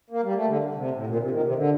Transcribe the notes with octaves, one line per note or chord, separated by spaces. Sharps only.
A#3
G3
A3
D3
C3
A2
A#2
D3
C3
D#3
C3
D3